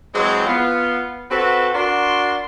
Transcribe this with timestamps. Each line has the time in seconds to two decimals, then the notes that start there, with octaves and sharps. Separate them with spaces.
0.14 E3 F#3 G#3 C4
0.47 B3 F4
1.31 C4 F#4 A4 B4
1.74 D4 F#4 A#4 C6